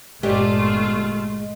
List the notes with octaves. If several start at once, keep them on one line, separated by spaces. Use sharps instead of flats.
G1 A#2 G#3 A3 F4 G4 D5